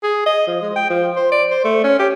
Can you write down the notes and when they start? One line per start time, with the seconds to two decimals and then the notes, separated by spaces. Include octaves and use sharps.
0.03 G#4
0.26 D#5
0.47 F3
0.62 G#3
0.76 G5
0.90 F3
1.16 C5
1.32 D5
1.51 C5
1.64 A3
1.84 C#4
1.99 G4